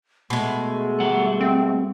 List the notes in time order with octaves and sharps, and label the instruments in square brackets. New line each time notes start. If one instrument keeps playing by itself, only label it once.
[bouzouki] B2 G#3 [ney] A3
[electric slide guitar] G3 F#5
[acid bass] C4